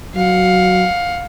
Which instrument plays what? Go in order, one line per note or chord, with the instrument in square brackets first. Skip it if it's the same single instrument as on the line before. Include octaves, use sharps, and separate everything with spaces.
[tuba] F#3 [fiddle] F5 F#5